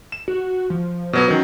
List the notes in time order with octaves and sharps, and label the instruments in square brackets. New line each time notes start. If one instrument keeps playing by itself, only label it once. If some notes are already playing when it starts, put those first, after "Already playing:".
[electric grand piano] E7
[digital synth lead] F#4
F3
[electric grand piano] B2 F#3 B3
[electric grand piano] D#3 F#3 [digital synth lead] C#4